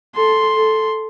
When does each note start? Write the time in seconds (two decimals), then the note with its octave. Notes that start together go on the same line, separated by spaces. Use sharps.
0.16 A4 C6
0.56 A4